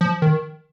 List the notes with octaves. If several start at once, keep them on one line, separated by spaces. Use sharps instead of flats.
F3
D#3